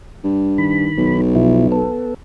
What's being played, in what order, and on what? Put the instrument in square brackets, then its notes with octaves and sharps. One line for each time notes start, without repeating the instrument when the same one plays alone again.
[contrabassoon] G2
[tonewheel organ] D#3 B5
[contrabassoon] B1
[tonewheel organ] B2 F3 E4
B3 A4